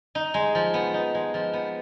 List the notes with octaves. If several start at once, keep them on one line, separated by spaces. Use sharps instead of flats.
D#4
G#3
F3
B3
D#4
G#3
F3
B3